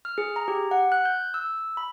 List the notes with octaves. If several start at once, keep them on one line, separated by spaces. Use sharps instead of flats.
F6
G#4
A#5
G4
F#5
F#6
G6
E6
B5